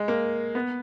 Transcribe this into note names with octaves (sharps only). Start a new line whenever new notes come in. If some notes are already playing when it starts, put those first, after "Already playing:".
Already playing: G#3
A#3
B3